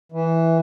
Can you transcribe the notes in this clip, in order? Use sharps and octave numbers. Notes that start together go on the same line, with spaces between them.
E3